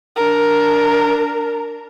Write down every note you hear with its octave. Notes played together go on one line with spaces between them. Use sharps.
D4 A#4